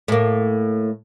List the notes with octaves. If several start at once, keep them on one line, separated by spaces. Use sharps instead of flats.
A2 A#3